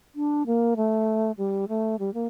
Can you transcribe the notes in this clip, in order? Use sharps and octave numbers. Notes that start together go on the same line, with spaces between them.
D4
A#3
A3
G3
A3
G3
A#3